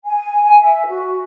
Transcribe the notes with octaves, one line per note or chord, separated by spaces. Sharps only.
G#5
E5
F#4